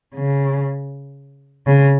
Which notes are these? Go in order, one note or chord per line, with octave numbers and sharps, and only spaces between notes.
C#3
C#3